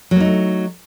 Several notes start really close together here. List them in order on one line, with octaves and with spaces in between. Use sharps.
F#3 A#3 D#4 A3